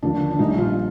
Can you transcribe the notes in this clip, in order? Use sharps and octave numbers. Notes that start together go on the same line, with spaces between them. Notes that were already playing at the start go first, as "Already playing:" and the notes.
D#2 D3 F3 D4
D4
A#1 A#2 G3 D#4
F4